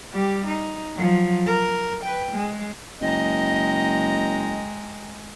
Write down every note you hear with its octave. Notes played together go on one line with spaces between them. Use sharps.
G3 G4
D#4
F3 F#3
A#4
B4 G5
G#3
F#1 G#3 D#5 G5 A#5